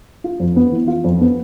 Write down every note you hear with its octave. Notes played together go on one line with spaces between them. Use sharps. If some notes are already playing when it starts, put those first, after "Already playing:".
F4
F2
B3
E3
F4
F2
B3